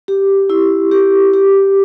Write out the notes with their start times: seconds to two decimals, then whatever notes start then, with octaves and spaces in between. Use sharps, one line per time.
0.08 G4
0.50 E4
0.92 G4
1.33 G4